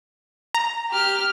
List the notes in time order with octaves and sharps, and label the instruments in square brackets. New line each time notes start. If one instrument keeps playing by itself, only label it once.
[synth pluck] A#5
[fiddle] G4 F6